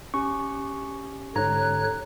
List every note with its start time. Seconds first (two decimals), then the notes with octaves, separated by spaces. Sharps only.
0.14 C#4 G4 C#6
1.36 G#2 D3 C#5 A#5 F#6